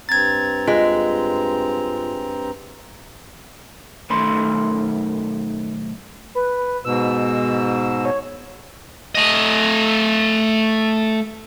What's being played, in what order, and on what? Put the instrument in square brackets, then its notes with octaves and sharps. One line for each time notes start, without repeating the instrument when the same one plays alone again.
[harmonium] G2 C4 A#5 [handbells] G#6 A6
[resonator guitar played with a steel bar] G#3 [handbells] F4
[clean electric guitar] B1 D#3 A3 B5 C6
[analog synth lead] B4
[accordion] G#2 B2 [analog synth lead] E6
[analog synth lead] C#5
[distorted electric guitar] A3 D#5